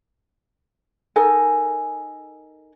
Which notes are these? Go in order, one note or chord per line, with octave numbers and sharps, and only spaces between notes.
D#4 A4 A#4 G#5